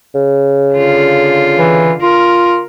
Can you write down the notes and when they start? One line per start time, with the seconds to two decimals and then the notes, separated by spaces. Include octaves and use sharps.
0.15 C#3
0.74 D3 F4
1.58 E3
2.02 F4 A#4